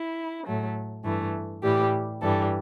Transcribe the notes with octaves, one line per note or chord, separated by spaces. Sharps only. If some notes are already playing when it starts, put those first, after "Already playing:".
Already playing: E4
A2 F#3 A3
G2 E3 A3
A2 E3 G3 G4
G2 E3 G3 A4